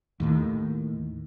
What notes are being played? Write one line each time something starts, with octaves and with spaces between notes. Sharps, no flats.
D#2 A2 D#3